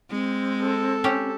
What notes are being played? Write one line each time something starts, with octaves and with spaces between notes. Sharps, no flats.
G#3 C4
A4
C#4 G4